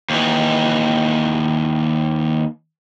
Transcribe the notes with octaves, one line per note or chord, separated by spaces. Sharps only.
D#2 E3